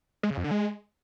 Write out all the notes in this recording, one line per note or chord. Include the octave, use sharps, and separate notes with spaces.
G#3
C#3
F2
D3
G#3